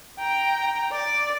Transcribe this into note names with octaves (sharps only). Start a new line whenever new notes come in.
G5 A#5
D5